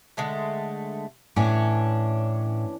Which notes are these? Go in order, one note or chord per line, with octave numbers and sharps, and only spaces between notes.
D3 G#3 A3
A2 E3 C#4 D4